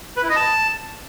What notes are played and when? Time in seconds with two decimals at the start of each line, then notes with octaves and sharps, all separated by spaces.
0.17 B4
0.23 E4
0.29 D#5
0.36 A5